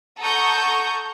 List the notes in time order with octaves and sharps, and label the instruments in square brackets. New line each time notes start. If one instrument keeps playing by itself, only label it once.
[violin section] A4 F#5 A#5 C#6 D#6 G6